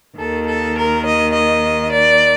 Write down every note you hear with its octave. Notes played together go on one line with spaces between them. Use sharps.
D#2 D#3 A4
A4
A#4
D#5
D#5
D5